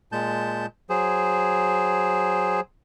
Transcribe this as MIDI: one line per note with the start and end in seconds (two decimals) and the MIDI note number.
0.12 0.66 46
0.12 0.66 56
0.12 0.66 81
0.12 0.66 91
0.90 2.61 54
0.90 2.61 68
0.90 2.61 72